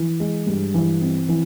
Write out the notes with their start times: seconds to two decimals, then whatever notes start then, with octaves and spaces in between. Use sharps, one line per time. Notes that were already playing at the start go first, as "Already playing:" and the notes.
Already playing: E3
0.20 G#3
0.47 G2
0.74 E3
1.02 C4
1.29 E3